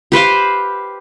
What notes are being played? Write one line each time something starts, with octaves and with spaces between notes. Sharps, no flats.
G4 B4 C5 F5